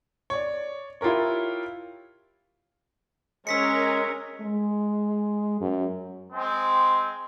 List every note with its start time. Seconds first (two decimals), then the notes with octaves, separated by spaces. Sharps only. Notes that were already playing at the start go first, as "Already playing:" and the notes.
0.30 C#5 D5
1.01 E4 F4 G4 A#4 C#5
3.47 G#3 C#4 A#4 E6 B6 C#7
4.41 G#3
5.61 F#2
6.33 G#3 C4